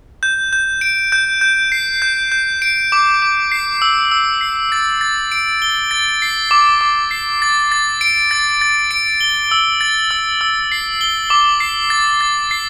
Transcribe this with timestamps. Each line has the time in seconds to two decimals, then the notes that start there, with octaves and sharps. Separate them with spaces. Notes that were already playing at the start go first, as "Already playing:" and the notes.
0.23 G6
0.53 G6
0.81 D7
1.12 G6
1.41 G6
1.72 C7
2.02 G6
2.32 G6
2.62 D7
2.92 D6
3.22 D6
3.52 C7
3.82 E6
4.11 E6
4.41 C7
4.72 A6
5.01 A6
5.32 D7
5.62 G7
5.91 A6
6.22 C7
6.51 D6
6.81 D6
7.11 C7
7.42 A6
7.72 A6
8.01 D7
8.31 A6
8.61 A6
8.91 D7
9.21 G7
9.51 E6
9.81 A6
10.11 E6
10.41 E6
10.72 C7
11.01 G7
11.30 D6
11.60 C7
11.90 A6
12.21 A6
12.51 C7